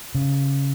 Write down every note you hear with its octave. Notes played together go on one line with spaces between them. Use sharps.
C#3